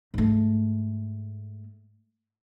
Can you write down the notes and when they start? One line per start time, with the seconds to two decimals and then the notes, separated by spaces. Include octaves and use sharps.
0.14 G#2 A3